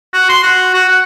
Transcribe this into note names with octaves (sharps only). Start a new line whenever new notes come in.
F#4
C6
F#4
F#4
F#5